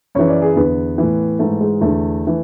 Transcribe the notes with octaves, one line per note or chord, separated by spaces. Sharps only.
F#2 C#3 E3 C#5
D5
G#4
E2 D3 B3
A2 E3
G#2 E3 A3
G#3
E2 D3 A3
E3